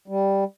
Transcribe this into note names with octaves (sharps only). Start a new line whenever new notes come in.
G3